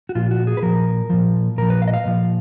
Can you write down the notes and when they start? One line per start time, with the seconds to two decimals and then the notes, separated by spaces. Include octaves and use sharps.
0.09 F#4
0.15 A#2 F3 F4
0.31 F#4
0.47 G#4
0.57 B4
0.62 A#2 F3 A#4
1.10 A#2 F3
1.58 A#2 F3 A#4
1.70 B4
1.82 F5
1.88 D#5
1.94 F5
2.05 A#2 F3